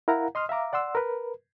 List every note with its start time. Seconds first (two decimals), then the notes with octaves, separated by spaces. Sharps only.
0.08 E4 A#4 F5 F#5 A#5
0.35 D#5 C6 D#6 F6
0.49 E5 F5 A#5 D6
0.73 D5 F#5 C6 E6
0.95 A#4 B4